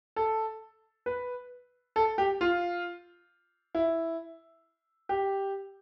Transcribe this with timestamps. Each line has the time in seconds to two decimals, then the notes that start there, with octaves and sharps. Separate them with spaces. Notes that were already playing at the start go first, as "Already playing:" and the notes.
0.16 A4
1.06 B4
1.96 A4
2.18 G4
2.41 F4
3.75 E4
5.09 G4